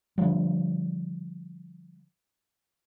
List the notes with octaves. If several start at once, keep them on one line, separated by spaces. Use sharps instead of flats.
D3 D#3 F3 G3